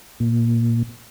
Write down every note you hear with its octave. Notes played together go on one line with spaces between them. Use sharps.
A#2